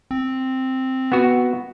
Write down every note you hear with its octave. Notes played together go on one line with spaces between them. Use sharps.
C4
B3 F#4